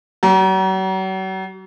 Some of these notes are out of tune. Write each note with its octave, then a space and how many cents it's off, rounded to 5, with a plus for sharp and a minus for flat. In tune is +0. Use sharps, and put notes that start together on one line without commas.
F#3 +40